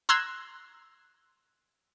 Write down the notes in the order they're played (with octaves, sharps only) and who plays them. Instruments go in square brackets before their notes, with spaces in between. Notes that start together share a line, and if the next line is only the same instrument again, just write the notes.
[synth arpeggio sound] A#5 C6 E6 F#6 G#6